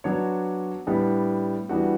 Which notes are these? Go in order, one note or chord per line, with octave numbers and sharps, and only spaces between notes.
F#3 B3 D4 F#4 C#5
A2 G3 B3 D4
E3 G3 B3 D4 F#4